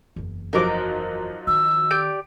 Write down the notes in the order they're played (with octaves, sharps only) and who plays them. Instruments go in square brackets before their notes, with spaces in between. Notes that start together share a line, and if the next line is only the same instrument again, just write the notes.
[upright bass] F#1 E2
[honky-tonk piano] F3 F#3 D#4 [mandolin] A#4 D6
[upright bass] D#3 [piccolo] E6
[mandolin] G4 D5 G6 [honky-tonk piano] D7